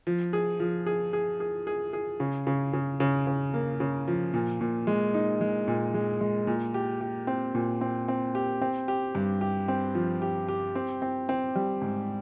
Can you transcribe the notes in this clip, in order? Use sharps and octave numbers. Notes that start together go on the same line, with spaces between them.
F3
G#4
F3
G#4
G#4
G#4
G#4
G#4
C#3
C#3
C#3
C#3
C#3
A#3
C#3
F3
A#2
A#2
G#3
D#4
G#3
A#2
G#3
G#3
A#2
G4
G4
C4
A#2
C4
C4
G4
C4
G4
G2
G4
C4
F3
G4
G4
C4
C4
C4
G3
G#2